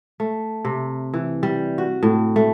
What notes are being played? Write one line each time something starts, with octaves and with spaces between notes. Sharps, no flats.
A3
C3
E3
G3
F#4
A2
A3